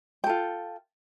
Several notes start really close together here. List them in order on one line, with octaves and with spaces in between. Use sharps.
G5 A4 F4